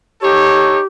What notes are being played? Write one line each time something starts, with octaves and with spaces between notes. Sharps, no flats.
D#4 G4 A4 C#5